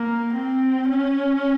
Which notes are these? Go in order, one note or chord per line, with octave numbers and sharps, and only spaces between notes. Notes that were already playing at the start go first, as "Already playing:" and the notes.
Already playing: A#3
C4
C#4